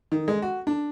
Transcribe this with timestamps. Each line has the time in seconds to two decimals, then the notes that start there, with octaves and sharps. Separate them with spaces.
0.12 D#3
0.28 G#3
0.42 F#4
0.67 D4